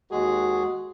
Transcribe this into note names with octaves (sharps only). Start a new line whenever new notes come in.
D#2 G#3 F#4 G#4